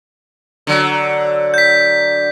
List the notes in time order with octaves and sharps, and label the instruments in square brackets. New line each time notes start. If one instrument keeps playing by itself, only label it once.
[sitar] D3 F#3
[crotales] G6 B6